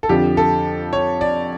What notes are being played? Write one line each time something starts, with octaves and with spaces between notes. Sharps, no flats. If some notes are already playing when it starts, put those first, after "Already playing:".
A4
F2 D3 F3 G4
A4
C#5
D5